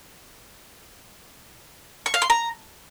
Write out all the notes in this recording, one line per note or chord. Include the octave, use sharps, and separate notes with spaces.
C#6
F5
C6
A#5